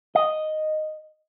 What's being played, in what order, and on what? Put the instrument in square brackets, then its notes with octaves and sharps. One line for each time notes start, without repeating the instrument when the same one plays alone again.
[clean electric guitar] D#5